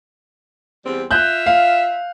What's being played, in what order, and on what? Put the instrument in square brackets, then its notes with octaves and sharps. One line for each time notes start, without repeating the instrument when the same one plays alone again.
[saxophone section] E2 G3 C4
[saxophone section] F4 E5 [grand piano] F#6 G6
[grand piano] F5